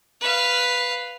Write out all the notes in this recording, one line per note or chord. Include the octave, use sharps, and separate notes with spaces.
B4 F5